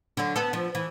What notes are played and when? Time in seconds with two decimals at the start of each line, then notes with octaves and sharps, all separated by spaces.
0.17 D3 F#3
0.36 B3 A4
0.53 F3
0.75 E3